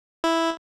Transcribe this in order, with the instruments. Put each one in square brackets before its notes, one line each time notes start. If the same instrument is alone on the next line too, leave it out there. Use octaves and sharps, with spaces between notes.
[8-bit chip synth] E4